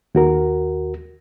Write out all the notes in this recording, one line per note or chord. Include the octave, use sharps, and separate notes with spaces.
D#2 F#4 A#4